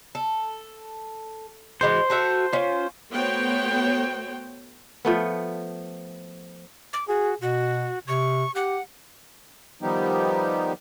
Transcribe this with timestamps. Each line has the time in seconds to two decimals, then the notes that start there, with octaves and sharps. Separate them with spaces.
0.15 A4
1.81 E3 G#3 F#4 C5
2.10 A3 F#4 E5
2.53 C#4 F4
3.15 A3 B3 F#4 C5 C#5 G5
5.05 F3 A3 B3
6.93 D6
7.08 F#4 G#4
7.42 B2 F#4
8.08 C3 C#6
8.55 G4 F#5
9.82 D#3 F3 G3 B3 D#4 G4